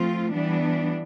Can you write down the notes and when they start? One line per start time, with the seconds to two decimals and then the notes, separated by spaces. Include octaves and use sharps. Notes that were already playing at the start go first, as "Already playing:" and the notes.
Already playing: F3 A3 C4 F4
0.33 E3 G3 B3 D4